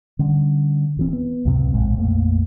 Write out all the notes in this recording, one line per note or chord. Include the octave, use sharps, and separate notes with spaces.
D3 G3 C#4
D#1 E3 C4
B3
C#2 F#2 A2 C3
A#1 A2 G#3
A#1 F2 A3 A#3